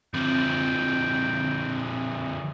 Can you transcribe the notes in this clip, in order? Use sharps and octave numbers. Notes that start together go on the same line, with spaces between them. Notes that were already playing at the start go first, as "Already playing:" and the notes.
D3 F3 C4 G5